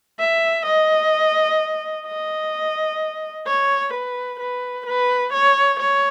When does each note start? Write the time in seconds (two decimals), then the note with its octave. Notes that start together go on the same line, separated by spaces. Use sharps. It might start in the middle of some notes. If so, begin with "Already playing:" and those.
0.20 E5
0.66 D#5
2.06 D#5
3.47 C#5
3.94 B4
4.40 B4
4.86 B4
5.34 C#5
5.80 C#5